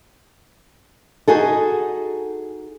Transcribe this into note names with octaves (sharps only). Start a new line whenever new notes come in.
D#4 F#4 G#4 A4